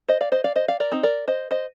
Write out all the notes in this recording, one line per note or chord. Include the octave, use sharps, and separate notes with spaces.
C5 D#5
D5 F5
C5 D#5
D5 F5
C5 D#5
D5 F5
A#4 D5
C4 D#4
A#4 D5
C5 D#5
C5 D#5